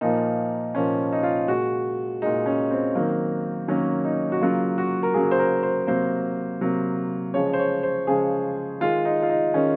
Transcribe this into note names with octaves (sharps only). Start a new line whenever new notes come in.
A#2 F3 A#3 D#4
A#2 F3 A#3 C#4
D#4
F4
A#2 G#3 F#4
A#2 G#3 D#4
C#4
C4
D#3 F#3 A#3
D#3 F#3 A#3 C#4
D#4
F#4
C#3 F#3 A#3 F4
F#4
A#4
C#3 F#3 A#3 G#4
C5
A#4
C5
C3 F#3 A#3 C5
C3 F#3 A#3
C#3 F3 G#3 C#5
C5
C#5
C5
C#3 F3 G#3 G#4
D#3 G#3 F4
D#4
F4
D#4
D#3 G#3 C#4